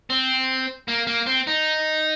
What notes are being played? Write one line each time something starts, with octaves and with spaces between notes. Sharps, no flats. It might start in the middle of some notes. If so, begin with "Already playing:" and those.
C4
A#3
A#3
C4
D#4